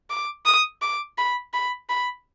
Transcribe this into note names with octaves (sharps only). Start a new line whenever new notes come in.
D6
D#6
D6
B5
B5
B5